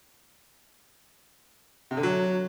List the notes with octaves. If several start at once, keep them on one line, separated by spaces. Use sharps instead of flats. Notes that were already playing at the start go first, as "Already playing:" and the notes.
C3
D3
F#3